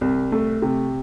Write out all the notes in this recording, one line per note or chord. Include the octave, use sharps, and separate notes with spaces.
C2
A3
C3